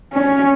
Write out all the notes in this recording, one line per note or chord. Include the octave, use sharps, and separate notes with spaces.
C#4